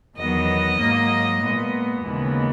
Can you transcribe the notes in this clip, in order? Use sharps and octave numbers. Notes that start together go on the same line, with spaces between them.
E2 D#3 F#3 B3 D#5
G#2 F#3 A#3
A#2 G#3 B3
D#2 C#3 E3 G#3 B3